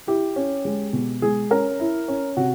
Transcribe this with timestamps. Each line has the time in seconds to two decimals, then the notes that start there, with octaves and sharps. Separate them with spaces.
0.07 E4 G4
0.36 C#4
0.65 G#3
0.93 B2
1.22 G#3 G#4
1.51 C#4 A#4
1.80 E4
2.08 C#4
2.37 C3 F#4